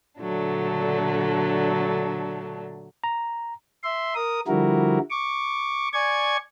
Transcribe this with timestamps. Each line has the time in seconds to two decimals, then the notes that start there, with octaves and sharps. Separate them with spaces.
0.20 A#2 D3 F#3 A3 D4
3.04 A#5
3.84 E5 C6
4.15 A#4 D#6
4.48 D3 F3 G3 E4 F#4 A#4
5.10 C#6 D6
5.93 D5 G#5 C#6 G#6